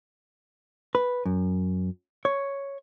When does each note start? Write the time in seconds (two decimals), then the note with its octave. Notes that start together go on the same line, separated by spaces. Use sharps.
0.95 B4
1.25 F#2
2.25 C#5